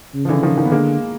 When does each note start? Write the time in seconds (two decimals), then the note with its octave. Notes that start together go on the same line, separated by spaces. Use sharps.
0.14 C#3
0.25 F3
0.29 D3 E3
0.43 D#3 F3
0.57 D#3 F3
0.65 B3
0.72 D3 G#3 A#3